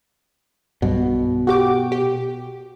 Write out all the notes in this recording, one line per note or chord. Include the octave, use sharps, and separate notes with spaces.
B1 G2 B2
F#4 G4 D6
G4